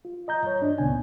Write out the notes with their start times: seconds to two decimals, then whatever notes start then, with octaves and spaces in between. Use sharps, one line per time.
0.05 F4
0.28 D#5 A#5 G6
0.43 G2 C#5
0.62 D4
0.78 C#2 A#2 C#3 B3 G#5